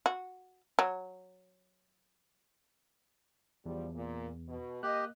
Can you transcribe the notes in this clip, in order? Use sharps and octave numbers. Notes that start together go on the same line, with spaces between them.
F#4
F#3
E2 F3 G3
A#2
B2
A#3 G4 D#5 F#6